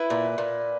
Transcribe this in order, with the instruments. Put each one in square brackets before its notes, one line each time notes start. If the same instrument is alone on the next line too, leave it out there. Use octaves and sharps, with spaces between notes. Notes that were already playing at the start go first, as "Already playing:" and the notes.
Already playing: [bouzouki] E4 [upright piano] B4
[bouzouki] A#2
A#2